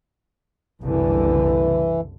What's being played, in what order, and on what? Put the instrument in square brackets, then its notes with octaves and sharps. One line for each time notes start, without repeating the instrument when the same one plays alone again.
[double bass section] F#1 C2 D3 [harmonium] E3